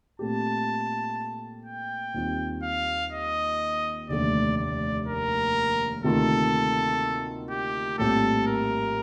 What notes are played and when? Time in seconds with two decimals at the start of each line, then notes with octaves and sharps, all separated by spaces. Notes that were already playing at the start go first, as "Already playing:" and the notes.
0.19 A#2 A3 C4 G4 A5
1.65 G5
2.14 D#2 D#3 G3 C4 F4
2.63 F5
3.12 D#5
4.09 F1 D#2 D3 A3 D5
4.57 D5
5.07 A#4
6.04 D2 C3 D#3 A#3 F4 A4
7.50 G4
7.98 A#1 A2 G3 C4 G4 A4
8.47 A#4